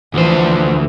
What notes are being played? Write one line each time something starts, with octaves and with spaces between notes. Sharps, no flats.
D2 E3 F3 C5